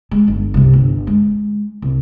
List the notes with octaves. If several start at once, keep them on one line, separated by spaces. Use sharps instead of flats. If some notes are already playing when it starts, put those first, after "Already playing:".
G#3
G1
C2 C3
G1
G#3
C2